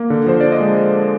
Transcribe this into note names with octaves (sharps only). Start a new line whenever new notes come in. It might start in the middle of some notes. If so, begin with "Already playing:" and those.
Already playing: A#3
D3
F3 C5
D4 D5
D#5
G#3